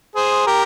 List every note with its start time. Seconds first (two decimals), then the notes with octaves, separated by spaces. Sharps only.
0.15 G#4 C5
0.47 G4 A#4